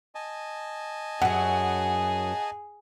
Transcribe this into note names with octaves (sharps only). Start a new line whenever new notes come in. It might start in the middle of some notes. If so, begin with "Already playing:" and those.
D#5 G#5 A5
F#2 F#3 G#4 F#5